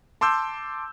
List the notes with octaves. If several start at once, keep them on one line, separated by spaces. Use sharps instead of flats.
A5 C6 D6 E6 G6